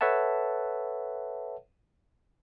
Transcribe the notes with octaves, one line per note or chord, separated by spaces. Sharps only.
A4 B4 C#5 E5 F#5 A5